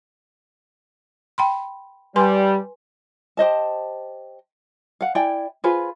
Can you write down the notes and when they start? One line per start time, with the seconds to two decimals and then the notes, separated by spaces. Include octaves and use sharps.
1.38 G5 B5 C6
2.16 G3 B4 G#5 C6
3.37 G4 C5 D#5 A5
5.01 F5 F#5
5.15 E4 D5 G5 G#5
5.64 F4 G#4 B4 C5